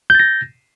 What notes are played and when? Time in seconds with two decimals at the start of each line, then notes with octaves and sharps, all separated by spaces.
0.10 G6
0.15 A6
0.19 A#6